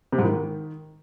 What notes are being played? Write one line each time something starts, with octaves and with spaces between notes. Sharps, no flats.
C3
G#2
D#3